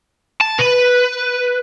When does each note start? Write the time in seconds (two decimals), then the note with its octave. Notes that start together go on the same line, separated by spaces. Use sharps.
0.41 A5
0.59 B4